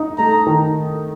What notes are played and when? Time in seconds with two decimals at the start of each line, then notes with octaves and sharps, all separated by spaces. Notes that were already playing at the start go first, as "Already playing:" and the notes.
Already playing: D#4
0.18 A3 A#5
0.47 D#3